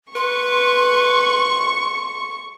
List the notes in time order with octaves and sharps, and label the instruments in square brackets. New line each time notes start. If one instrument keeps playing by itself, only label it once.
[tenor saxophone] B4 [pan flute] C6 [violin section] C#6